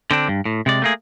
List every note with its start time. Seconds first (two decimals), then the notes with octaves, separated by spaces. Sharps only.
0.11 D3 C4 D4
0.28 G2
0.45 A2
0.66 C3 G#3 D5
0.82 A3 A#3 G#4